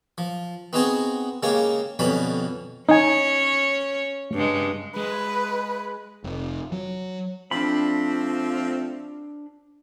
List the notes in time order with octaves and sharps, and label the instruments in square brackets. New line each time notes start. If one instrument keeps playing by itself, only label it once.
[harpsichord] F3
B3 C4 D#4 F#4 G#4 C5
C#3 G#3 A#3 G4 C#6
F2 B2 D3 G3 C#4 B5
[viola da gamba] C#4 C#5 [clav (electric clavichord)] D#4 G#5
[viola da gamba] G2 C#3 G#3
[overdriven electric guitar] G#3 [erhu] B4
[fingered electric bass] F1
F#3
[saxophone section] F3 A3 C4 [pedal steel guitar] D4 B5